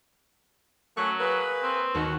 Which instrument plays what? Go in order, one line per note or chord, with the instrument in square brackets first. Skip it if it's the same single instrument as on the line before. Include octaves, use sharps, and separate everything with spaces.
[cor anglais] F#3 [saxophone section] A3 A#3 C#4 [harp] C#6 F#6
[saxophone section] A#3 G#4 B4
[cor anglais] C4
[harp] D#2 [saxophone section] D#3 F#4